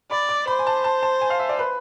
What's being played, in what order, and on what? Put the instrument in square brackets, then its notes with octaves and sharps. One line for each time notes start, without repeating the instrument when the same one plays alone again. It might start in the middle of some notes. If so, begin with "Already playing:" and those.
[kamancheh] D5 [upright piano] B5
[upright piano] D6
[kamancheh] C5 [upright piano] B5
[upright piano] G#5
A5
A5
A5
G#5
F5
E5
D5
B4